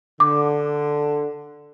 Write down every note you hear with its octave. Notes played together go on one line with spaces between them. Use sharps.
D3 D6